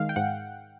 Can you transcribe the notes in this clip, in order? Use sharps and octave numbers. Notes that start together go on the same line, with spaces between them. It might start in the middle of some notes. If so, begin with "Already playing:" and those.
Already playing: D#3 G#3 F5
G5
G#2 F#5